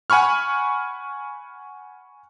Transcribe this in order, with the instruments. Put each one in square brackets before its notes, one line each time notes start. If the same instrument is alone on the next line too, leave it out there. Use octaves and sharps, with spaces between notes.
[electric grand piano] F#5 G#5 B5 C#6 F6